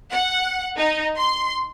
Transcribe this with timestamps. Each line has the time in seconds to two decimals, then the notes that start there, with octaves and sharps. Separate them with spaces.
0.10 F#5
0.78 D#4
1.16 C6